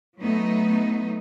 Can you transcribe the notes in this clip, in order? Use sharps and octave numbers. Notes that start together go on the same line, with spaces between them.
F#3 A3 B3 D#4